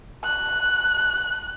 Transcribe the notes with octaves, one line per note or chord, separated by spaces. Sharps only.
F#6